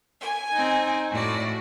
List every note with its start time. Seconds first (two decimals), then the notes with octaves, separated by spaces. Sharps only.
0.20 G#5
0.53 C4 D#4
1.11 A2 F#4 D5